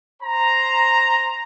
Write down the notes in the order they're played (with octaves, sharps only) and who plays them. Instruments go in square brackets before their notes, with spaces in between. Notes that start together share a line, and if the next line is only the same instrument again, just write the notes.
[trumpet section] C5 A#5